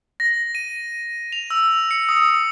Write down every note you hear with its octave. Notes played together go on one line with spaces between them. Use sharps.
A#6
D#7
F7
E6
C#7
D#6